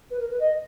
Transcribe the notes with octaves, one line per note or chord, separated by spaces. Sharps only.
B4
A#4
B4
D#5